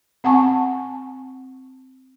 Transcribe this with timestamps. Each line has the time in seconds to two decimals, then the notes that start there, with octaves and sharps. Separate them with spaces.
0.24 C4 F#5 G#5 A5 C#6